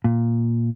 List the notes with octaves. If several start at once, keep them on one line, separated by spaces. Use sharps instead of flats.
A#2